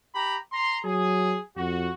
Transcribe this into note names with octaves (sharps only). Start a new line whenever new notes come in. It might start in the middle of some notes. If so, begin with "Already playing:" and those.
G4 A#5 B5
A#5 C6
F#3 G#4
F2 F#4